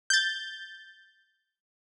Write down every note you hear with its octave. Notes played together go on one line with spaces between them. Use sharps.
G6 A6